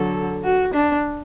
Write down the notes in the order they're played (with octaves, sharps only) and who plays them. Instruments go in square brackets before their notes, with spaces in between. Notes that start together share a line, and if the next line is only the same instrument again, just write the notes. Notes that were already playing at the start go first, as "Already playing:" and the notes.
Already playing: [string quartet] D3 F#3 A4
F#4
D4